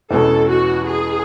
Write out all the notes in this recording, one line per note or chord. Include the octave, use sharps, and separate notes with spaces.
E2 B2 G#3 C#4 A4
F#4
G#4